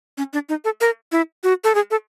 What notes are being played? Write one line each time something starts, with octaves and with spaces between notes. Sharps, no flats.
C#4
D4
D#4
A4
A#4
E4
F#4
A4
G#4
A4